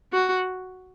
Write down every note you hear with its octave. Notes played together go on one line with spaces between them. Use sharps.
F#4